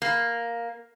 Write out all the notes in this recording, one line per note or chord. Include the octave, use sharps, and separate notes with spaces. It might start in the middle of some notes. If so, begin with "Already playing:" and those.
A#3